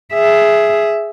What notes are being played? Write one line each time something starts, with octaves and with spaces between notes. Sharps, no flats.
G#4 E5